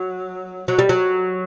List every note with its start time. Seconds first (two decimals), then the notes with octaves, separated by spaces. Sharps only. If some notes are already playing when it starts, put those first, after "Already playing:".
Already playing: F#3
0.68 F#3
0.79 G3
0.89 F#3